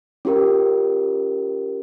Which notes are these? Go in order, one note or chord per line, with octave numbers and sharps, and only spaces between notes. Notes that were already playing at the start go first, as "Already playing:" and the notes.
C#4 F4 G4 A#4